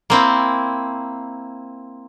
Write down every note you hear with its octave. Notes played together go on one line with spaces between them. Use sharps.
A#3 C4 E4